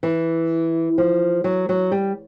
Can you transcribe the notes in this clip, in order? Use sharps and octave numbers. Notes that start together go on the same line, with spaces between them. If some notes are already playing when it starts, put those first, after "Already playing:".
E3
F3
F#3
F#3
G3